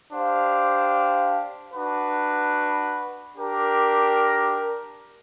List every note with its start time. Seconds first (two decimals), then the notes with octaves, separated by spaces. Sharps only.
0.11 D4 G4 C5 F5
1.73 D4 F#4 B4
3.36 D4 G4 A#4